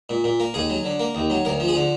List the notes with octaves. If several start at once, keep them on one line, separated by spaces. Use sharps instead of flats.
A#2
A#2
A#3
D#2 G#4
F#3
D3
A#3
D#2
F#3
D2 A#4
F3
G#4
D3